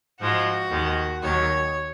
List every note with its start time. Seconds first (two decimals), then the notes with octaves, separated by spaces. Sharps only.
0.20 G#2 F3 G#3 F#4
0.71 D#2 D#3 G#3
1.22 D#2 D#3 F#3 C#5